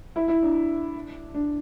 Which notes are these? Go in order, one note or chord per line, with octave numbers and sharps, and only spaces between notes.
E4
E4
D4
D4